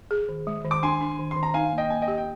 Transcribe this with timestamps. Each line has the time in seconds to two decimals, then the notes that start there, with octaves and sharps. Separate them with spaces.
0.11 G#4
0.29 D#3
0.47 G#3
0.65 D#3
0.71 D6
0.83 D4 G#5 C6
1.01 D4
1.19 D#3
1.31 C6
1.37 D#3
1.43 A#5
1.54 D#4 F5 G#5
1.72 A#3
1.78 D#5 G5
1.90 A#3 G#5
2.02 D#5 G5
2.08 G4
2.18 G5